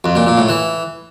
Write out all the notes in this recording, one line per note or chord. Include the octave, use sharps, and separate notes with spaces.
F2
A#2
A#2
A2
E3